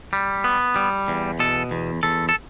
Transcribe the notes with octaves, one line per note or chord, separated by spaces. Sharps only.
G3
B3
G3
E2
B2 A4
E2
E2 A4
A4